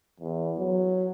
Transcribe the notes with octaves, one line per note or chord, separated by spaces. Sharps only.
E2
F#3